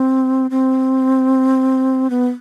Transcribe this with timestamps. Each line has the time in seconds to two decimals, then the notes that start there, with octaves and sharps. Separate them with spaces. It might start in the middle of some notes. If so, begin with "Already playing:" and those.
Already playing: C4
0.51 C4
2.10 B3